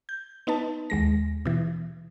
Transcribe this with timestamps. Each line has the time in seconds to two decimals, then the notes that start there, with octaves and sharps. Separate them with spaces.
0.09 G6
0.47 B3 D#4 B4 A5
0.90 D#2 G#3 A#6
1.45 B2 E3